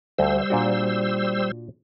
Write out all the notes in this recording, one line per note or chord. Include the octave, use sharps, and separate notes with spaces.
D2 G3 C5 E6
A#2 D4 F#4